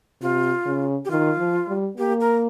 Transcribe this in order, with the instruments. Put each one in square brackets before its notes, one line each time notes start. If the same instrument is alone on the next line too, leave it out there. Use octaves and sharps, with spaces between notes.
[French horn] C3 [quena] F4
[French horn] C#3
[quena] G4
[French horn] D#3 [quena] F4
[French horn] F3
G3
[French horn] A#3 [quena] G4
[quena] A#4